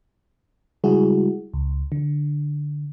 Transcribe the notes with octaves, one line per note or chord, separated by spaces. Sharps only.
C#3 G3 G#3 E4 F#4 G#4
C#2
D3